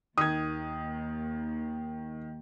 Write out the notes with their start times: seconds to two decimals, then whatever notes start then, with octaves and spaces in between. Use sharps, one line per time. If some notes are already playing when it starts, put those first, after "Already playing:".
0.18 D#2 D#3 D#6 G#6